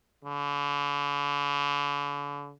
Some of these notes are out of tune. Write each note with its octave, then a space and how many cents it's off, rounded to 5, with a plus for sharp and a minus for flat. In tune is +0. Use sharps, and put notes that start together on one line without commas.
D3 -40